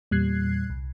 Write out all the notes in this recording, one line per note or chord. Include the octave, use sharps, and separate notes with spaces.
E2 A#2 G3 F#6 G#6 C7
C2